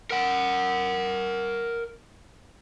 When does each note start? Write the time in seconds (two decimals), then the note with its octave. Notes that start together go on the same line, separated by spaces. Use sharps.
0.11 A#4 F#5